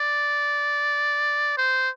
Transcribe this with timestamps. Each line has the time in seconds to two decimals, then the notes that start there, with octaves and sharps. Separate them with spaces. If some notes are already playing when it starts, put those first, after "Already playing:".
Already playing: D5
1.57 C5